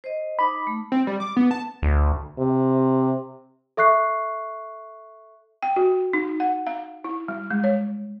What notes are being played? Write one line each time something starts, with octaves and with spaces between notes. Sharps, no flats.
C5 D#5
D#4 B5 D6
A3
C4
G3
D6
B3
A5
D2
C3
A4 E5 C#6 F#6 C7
G5
F#4
D#4
F#5
F5
E4
G3
G#3
C#5